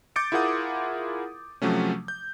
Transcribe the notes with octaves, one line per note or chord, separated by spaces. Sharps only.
D6 G6 A6 C#7 D7
E4 F4 G#4 A#4 F#5 D#6
C3 F3 F#3 A3 C#4
G6